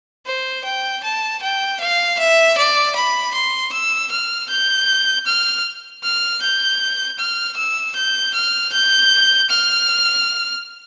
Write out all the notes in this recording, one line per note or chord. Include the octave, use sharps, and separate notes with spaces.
C5
G5
A5
G5
F5
E5
D5
B5
C6
E6
F6
G6
F6
F6
G6
F6
E6
G6
F6
G6
F6